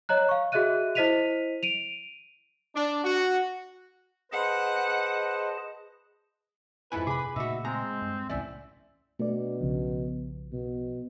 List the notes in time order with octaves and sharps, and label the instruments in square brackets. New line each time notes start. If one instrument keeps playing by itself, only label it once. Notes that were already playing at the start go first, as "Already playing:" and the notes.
[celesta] C#5 D#5 A#5 F#6
F5 C#6
F#4 G#4 D#5 E5 F#6 D#7
E4 C5 D#5 B6 D#7 F7
D7 D#7 F7
[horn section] D4
F#4
[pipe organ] G#4 D#5 A5 [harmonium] B4 C5 [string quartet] F#5
[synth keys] F2 A4 F#6 [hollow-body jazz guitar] G#2 E4 G#5 [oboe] B4
[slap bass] C3 [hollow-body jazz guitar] G#4 [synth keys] B5 D6
[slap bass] A#2 C#3 A3 [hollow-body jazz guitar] D#4 F#4 [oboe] E5
[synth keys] G#3 [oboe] C4 [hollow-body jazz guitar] A#5
[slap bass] G2
[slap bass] C2 E3 [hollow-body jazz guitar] A2 C#4 D5 [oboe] E5
[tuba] B2 [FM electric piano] A3 D4 D5
[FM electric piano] B1 C#3 F3
[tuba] B2